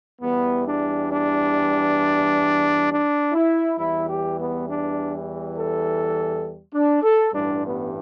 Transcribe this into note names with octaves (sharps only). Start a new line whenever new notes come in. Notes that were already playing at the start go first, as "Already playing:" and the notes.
E2 E3 G3 B3
D4
D4
D4
E4
E2 E3 G3 E4
G4
B3
D4
A4
D4
A4
A1 G2 E3 G3 D4
B3